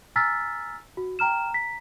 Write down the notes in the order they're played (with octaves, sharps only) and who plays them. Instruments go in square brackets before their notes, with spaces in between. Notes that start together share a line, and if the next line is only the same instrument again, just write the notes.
[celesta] G#5 A#5 E6 F6 A6 B6
F#4
G5 A#5 F6 E7
A#5 B6